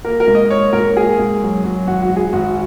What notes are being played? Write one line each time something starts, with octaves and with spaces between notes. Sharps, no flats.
A#3 A#4
A#4
G#2
D#5
A#3 C#5
G#2 A#4
A#3 G#4
G#2
F#3
F#3
G#1 F#4
F#4
G#1
G#4
G#1 F#4